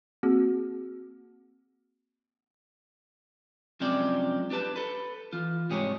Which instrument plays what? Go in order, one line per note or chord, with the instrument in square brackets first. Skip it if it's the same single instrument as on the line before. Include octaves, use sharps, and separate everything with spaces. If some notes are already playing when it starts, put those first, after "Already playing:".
[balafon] A#3 C4 F#4 G#4
[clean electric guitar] F#2 C3 F3 G#3 G4 D5
D4 G4 B4 A5
A4 B4
E3 F4
C2 G#2 G#3 G4 G#4 C#5